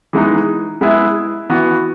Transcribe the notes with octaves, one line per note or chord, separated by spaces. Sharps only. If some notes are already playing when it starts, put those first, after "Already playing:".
E3 G#3 B3 D#4
G#3 B3 E4 G#4
E3 B3 F#4